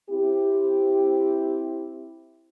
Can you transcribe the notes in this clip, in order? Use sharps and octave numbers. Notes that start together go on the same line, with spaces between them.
C4 E4 G4